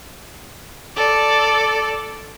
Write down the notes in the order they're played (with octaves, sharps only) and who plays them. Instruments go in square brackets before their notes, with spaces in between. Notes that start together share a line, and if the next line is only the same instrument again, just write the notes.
[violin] A4 D5